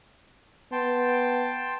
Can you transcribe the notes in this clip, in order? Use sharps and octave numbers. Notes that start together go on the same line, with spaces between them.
B3 G5 A5 C6